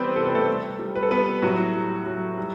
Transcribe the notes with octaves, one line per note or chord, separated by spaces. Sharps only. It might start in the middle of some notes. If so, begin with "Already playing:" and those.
Already playing: E3 G3 B3 C4 B4 C5 D5
C3 A4
B4
A3 A4
G3
G3
B4
A4
G3 B3 B4
A2 F#3 F#4
F#3
F#3
G3